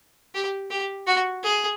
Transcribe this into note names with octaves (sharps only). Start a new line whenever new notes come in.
G4
G4
F#4
G#4